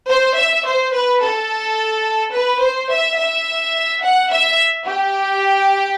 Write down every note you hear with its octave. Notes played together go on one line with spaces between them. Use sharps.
C5
E5
C5
B4
A4
B4
C5
E5
E5
F#5
E5
G4